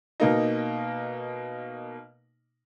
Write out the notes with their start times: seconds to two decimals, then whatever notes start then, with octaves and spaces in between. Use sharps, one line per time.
0.20 B2 A#3 D#4